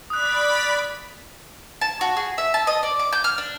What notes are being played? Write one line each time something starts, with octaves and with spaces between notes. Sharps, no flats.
D5 B5 D#6 F#6 B6
A5
F#4
G#4
E5
A5
D#5
D5
D6
G6
F6
D4